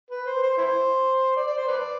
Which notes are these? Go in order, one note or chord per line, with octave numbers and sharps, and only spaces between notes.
B4
C5
C5
E4 C5
D5
D5
C5
B4 D5